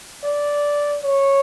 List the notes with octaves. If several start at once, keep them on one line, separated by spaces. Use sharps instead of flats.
D5
C#5